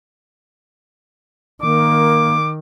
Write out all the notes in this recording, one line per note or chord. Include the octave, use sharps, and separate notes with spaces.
D#3 A#3 D6